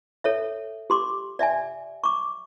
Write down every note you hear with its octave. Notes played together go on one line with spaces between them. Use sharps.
A4 C#5 E5
G4 C6 D6
D5 E5 G5 G#5
C#6 D6